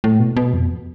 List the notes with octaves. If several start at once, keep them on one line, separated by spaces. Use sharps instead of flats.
A2
B2
B2
F2